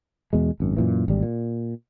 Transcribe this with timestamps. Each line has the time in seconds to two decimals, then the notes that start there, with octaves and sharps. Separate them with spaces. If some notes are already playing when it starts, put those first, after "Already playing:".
0.33 E2 B2 G#3
0.60 G#1 F#2
0.77 F#2 A#2 E3
1.08 G#1 D2 G3
1.23 A#2